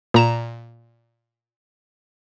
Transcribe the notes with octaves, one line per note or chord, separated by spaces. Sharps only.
A#2 A#5 E7